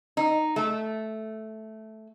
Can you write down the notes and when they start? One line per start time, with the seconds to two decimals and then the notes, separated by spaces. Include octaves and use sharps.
0.17 D#4
0.56 A3